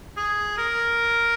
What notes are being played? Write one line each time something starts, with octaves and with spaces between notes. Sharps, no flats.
G#4
A#4